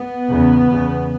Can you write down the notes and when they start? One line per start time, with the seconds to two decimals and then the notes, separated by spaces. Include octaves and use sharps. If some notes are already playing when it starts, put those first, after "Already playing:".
Already playing: B3
0.28 E2 C#3
0.69 E2 C#3